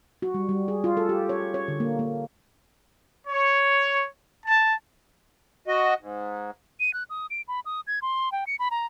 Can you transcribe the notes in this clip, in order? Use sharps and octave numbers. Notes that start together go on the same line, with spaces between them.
F#4
G3
G3
G#4
F4
A4
G4
C#5
C#5
D3
A#3
A#3
C#5
A5
F#4 D#5
G#2
D#7
F#6
D#6
D7
B5
D#6
G#6
C6
G5
C#7
B5
A#5